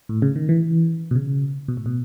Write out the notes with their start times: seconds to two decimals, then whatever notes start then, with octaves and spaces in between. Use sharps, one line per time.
0.09 A2
0.22 C#3
0.36 D#3
0.49 E3
1.11 B2
1.15 C#3
1.68 B2
1.77 A2
1.86 B2